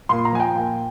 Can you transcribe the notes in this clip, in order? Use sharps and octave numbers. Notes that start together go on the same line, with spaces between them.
A#2 C6
A#5
F3 G#5
G5
A#2